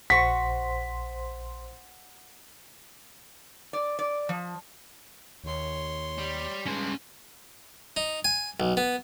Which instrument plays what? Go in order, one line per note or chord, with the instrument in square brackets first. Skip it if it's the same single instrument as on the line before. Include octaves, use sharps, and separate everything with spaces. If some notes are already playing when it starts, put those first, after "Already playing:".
[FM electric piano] A#1 C5 C6 [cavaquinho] F#4 C#6 [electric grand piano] B6
[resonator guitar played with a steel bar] D5
D5
F3
[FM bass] D#2 [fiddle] C#5 C6
[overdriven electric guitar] G3
[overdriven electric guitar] G2 G#3 [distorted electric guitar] C#4 C6
[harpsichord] D#4
G#5
B1
B3